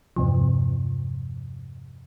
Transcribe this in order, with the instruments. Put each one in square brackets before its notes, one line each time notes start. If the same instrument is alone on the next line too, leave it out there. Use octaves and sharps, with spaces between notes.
[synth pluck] E2 G2 C3 F3